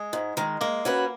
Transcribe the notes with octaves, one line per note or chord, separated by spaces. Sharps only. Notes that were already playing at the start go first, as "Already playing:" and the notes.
Already playing: G#3
G#2
D#3 G#3
G#3 A#3
C#4 F#4 B4